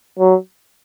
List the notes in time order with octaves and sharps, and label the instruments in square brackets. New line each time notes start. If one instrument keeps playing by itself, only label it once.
[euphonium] F#3